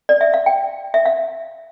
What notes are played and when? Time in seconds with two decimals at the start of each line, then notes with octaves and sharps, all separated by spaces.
0.09 D5
0.21 E5
0.34 F5
0.46 G5
0.94 E5
1.06 F5